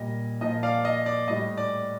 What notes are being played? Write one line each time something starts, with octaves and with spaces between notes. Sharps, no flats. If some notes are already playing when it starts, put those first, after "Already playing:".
Already playing: A#2 G3 D#5
A#2 F3 D#5
D5 F5
D#5
D5
A2 G3 D#5
D5